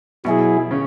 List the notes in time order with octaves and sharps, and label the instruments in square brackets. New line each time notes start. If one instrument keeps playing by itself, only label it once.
[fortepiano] B2 [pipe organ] F#3 E4 G#4
[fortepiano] C#3 C#4